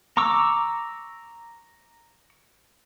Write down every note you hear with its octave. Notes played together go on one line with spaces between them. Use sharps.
A#5 C#6 D6 E6